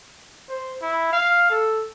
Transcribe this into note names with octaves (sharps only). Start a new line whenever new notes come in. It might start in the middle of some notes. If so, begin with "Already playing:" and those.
C5
E4
F5
A4